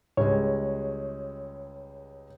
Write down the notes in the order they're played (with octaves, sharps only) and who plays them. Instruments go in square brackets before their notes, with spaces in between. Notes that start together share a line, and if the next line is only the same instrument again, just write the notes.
[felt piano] C#2 G3 G#3 [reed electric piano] C#5